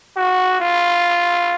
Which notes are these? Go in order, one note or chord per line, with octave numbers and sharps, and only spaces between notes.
F#4
F4